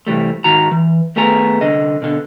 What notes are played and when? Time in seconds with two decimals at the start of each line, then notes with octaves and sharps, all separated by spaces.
0.07 C3 E3 G3 A3
0.44 G#2 D#3 F#4 A#5
0.71 E3
1.16 D#2 A3 B3 G#4 A#5
1.61 C2 D3 D#5
2.02 B2 D3